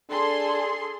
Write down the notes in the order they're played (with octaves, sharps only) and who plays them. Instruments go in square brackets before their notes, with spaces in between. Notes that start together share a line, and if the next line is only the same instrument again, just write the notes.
[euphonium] D4 [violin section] G#4 A4 C6